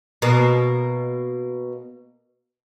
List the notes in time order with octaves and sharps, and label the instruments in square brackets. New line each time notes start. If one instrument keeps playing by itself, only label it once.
[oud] B2 A#3